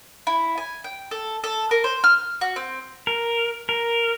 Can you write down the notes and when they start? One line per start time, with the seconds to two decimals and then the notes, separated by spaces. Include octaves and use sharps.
0.27 E4
0.58 G#5
0.84 G5
1.11 A4
1.44 A4
1.71 A#4
1.84 C5
2.04 F6
2.41 F#4
2.56 C4
3.07 A#4
3.69 A#4